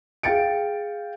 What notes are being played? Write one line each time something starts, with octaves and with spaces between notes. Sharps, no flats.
G#4 F5 G5 A6 C#7 D7